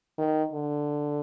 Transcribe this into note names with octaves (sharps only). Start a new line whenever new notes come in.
D#3
D3